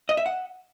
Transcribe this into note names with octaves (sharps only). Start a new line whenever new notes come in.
D#5
E5
F#5